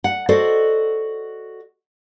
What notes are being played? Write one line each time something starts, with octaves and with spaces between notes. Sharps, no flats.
F#5
F#4 A4 C5 D5 D#5